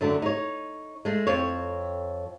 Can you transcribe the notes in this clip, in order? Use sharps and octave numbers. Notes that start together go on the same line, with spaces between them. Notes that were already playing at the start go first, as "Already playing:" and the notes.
F#2 D3 A3
D#4 C#5
G#3 A3
F2 C4 C#5